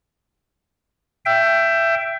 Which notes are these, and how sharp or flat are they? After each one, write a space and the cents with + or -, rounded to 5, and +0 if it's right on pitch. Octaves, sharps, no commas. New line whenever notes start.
E5 +20 G5 +0